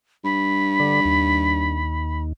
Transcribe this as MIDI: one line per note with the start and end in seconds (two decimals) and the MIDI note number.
0.24 1.84 43
0.24 2.22 83
0.80 1.00 50
1.05 2.33 39